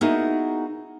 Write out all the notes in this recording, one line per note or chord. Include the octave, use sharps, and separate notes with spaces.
A#3 B3 D#4 E4 F#4 G#4